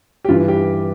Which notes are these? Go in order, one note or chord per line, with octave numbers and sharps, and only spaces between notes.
G4
G2 E3 F4
G4